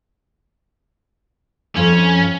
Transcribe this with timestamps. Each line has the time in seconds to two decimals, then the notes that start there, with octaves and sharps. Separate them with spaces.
1.77 F2 C#4